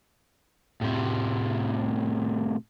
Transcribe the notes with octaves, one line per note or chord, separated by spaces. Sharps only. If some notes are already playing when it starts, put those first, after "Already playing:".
A2 C3